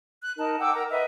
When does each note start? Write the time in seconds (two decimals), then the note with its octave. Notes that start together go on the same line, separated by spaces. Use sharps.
0.21 F#6
0.37 D#4 A#4 A5
0.60 F#5 G5 D6 E6
0.74 A#4 A#5
0.90 B4 D#5 E5